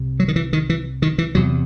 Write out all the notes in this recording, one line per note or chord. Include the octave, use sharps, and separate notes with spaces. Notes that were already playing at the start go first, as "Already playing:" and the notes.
Already playing: C2 C3
F#3
D#3
E3
D#3
E3
D#3
E3
E2 C3 F#3